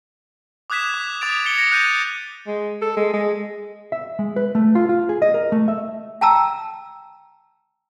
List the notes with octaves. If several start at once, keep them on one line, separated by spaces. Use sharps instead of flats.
D6 D#6 F#6 G#6 B6 E7
D6
D6 D#6 G#6 A6 D7 F7
G#6 A6 C#7 G7
A#6 C#7
F#6 G6 D#7
G#3
A4
G#3
G#3
E5
G#3
B4
A3
F4
F4
G#4
D#5
A#4
A3
E5
G5 A5 A#5 E6